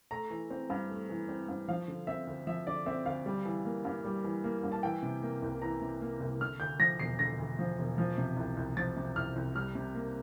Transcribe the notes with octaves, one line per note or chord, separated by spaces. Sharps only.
A3 A#5
E3
C4
G2
A3
E3
C4
G2
F3 F5
D3
C4 E5
D2
F3 E5
D3 D5
C4 E5
D2 F5
G3
E3
A#3
G2
G3
E3
A#3
G2
A5
E3 G5
C3
A#3
C2
E3 A#5
C3
A#3
C2
D3 F6
D2 G6
F3 A#6
E1 C7
D3 A#6
D2
F3
E1
F3
C3
C2
C2
F3 A6
C3
C2 F6
C2
G3 F6
C3
A#3